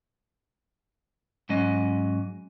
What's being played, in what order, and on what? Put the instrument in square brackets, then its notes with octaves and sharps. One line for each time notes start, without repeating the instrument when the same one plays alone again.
[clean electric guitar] G#2 F#3 C#4 D#5